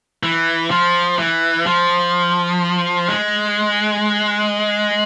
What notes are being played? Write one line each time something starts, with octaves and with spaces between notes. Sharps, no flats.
E3
F3
E3
F3
G#3